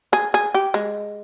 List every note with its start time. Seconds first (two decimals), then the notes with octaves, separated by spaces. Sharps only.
0.13 G#4
0.34 G#4
0.54 G4
0.74 G#3